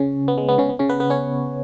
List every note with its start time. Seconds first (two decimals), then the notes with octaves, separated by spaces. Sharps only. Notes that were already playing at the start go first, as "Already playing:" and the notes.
Already playing: C#3 C#4
0.28 B3
0.38 G#3
0.48 B3
0.58 C#3 C#4
0.69 B3
0.79 C#3 C#4
0.89 B3 B4
1.00 B3 B4
1.10 C#4 C#5